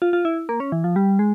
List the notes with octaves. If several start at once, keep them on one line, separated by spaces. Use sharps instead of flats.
F4
F4
E4
A#3
C#4
E3
F3
G3
G#3